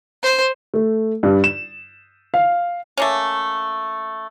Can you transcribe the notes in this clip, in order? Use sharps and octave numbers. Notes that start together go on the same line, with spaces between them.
C5
A3
G2
E7
F5
A3 A#3 C#4